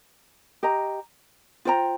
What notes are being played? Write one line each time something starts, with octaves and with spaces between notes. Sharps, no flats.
G4 D#5 A#5
F4 C5 G5 A#5